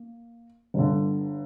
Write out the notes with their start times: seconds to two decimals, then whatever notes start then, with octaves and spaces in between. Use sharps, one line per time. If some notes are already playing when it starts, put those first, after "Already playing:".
Already playing: A#3
0.74 G1 G2 D3